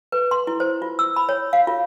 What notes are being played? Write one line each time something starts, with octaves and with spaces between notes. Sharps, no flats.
B4
C6
E4
C5
F4
E6
B5
C#5
F5
F4